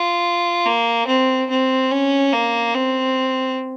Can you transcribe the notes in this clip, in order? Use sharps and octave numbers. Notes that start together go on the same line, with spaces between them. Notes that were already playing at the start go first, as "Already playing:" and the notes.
Already playing: F4
A#3
C4
C4
C#4
A#3
C4